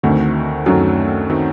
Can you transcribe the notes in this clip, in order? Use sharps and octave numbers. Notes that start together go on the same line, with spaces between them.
D2 D3 D#3 A3 C4 F#4
F#2 D#3 F#3 A3 C4 F#4
D#3 A3 C4 F#4